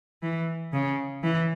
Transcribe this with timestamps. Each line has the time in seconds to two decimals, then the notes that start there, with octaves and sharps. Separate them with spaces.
0.23 E3
0.73 C#3
1.23 E3